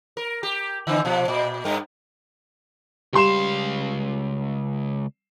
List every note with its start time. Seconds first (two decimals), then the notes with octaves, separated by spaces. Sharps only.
0.17 A#4
0.43 G4
0.87 D3 E3 C4
1.05 B2 F3
1.28 A#2
1.65 G2 A#4
3.13 C#2 G3 F5 C6 E7